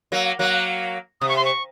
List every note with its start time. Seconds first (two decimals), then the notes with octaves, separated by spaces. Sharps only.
0.12 F#3 A#3
0.39 F#3 A#3 F#6
1.21 C3 D#6
1.29 C#6
1.36 C6
1.45 C#6